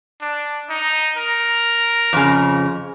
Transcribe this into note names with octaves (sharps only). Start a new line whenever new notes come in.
D4
D#4
A#4
F2 C#3